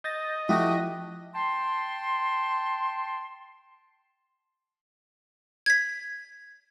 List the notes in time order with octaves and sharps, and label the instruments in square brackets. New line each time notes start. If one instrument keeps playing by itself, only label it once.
[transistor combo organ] D#5 [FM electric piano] G6 A6 A#6
[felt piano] F3 [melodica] A3 F#4 G4 [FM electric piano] E4 D#6 A#6
[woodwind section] G5 A5 C6
[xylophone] G#6 B6